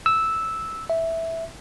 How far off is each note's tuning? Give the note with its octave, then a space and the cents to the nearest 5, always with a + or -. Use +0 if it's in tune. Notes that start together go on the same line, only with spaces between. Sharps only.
E6 -5
E5 -5